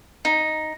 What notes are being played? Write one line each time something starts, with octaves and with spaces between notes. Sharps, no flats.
D#4